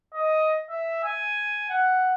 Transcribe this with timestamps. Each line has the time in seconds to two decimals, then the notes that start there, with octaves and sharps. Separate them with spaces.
0.14 D#5
0.70 E5
1.03 G#5
1.70 F#5